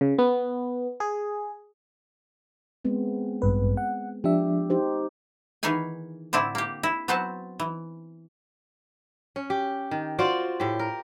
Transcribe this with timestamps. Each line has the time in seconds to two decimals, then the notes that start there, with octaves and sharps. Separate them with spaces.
0.01 C#3
0.19 B3
1.00 G#4
2.85 G#3 B3 C4
3.42 A1 G2 B4
3.77 F#5
4.24 F3 D4 G4 E5
4.70 D#4 G4 C5
5.63 D#3 E3 B3 D#4 G#4 G#5
6.33 A2 D3 C4 D4 E4
6.55 A#3 G4
6.83 E4
7.08 F#3 B3 C4 F#4 C5 A5
7.60 E3
9.36 C#4
9.50 G4
9.91 D#3
10.19 F4 F#4 C5 D5
10.60 A2 G4
10.79 A#4